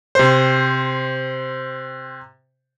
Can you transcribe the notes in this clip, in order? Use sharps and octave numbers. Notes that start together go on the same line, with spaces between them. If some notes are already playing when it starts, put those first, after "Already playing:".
C3 C5